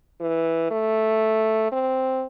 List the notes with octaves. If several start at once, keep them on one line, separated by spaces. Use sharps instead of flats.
E3
A3
C4